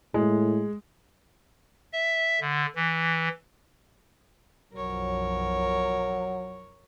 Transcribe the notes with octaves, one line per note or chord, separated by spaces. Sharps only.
A2 G#3
E5
D3
E3
B1 F#2 F3 F#3 A#4 C#5